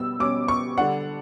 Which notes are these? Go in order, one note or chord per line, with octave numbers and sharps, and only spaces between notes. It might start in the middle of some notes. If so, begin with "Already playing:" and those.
Already playing: B2 G3 E6
B2 G3 C#4 D6
C#6
D3 G3 D4 F#5